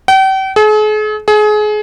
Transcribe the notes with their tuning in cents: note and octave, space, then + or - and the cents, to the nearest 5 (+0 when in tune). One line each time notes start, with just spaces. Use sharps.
G5 -40
G#4 +45
G#4 +30